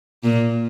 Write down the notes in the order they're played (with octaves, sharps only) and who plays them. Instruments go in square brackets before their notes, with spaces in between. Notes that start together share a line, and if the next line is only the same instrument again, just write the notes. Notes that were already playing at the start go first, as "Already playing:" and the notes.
[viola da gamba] A#2